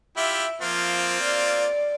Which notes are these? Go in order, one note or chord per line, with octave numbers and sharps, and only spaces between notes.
E4 F4 G4 E5
F3 A#3 C4 F4
D5